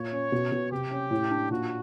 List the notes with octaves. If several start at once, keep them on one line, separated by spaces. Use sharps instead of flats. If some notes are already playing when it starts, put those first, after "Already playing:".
Already playing: A#2 C#5
C#4
B2
B2
C3 G4
C#4
A2
D4
A#2 F#4